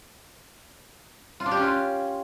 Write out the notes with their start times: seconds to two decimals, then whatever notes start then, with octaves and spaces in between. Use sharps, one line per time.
1.40 F4
1.46 D4
1.51 G4
1.57 C#4
1.63 F4